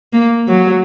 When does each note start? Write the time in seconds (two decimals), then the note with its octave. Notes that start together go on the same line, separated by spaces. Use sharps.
0.13 A#3
0.48 F#3